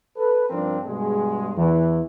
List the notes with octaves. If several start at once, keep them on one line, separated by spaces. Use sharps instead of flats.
A4 B4
G2 F3 C4 D4 A#4
G2 B2 G#3
E2 E3